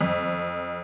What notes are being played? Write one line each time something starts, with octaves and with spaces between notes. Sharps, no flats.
F2